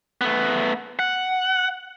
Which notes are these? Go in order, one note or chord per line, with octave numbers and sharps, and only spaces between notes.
A3 B3
F#5